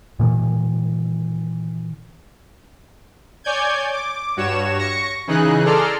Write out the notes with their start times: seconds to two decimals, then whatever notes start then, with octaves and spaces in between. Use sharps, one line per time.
0.20 A#2 D#3 E3 A#3
3.44 C#5 D5 G#5 G6 G#6
3.93 D6
4.37 G2 F#4 C#5 E7
4.78 C#6 A#6 C#7
5.27 C#3 E3 D#4 G#4 F#6
5.65 G#4 A4 D5 A#5 C6 F6